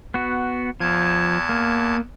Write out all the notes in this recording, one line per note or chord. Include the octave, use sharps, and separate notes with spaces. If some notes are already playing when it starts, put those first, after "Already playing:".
B3 F#4
E2 F3 A5 G#6
A#3